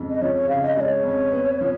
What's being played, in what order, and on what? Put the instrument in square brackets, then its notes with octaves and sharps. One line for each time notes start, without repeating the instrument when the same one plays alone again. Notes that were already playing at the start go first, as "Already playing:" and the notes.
Already playing: [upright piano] F2 C#3 G#3
[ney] D#5
[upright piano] F3 [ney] C#5
[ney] C#5
[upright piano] C#3 [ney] F5
[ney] D#5
[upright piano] G#3 [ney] C#5 D#5
[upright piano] F2
B3
F3